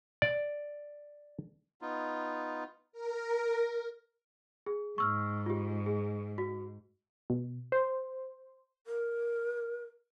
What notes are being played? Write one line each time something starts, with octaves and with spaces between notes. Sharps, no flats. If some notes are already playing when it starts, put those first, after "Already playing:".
D5
B3 D#4 F4
A#4
G#4
G#2 C#6 E6 F6
F4 G4
G#4
F#4
B2
C5
A#4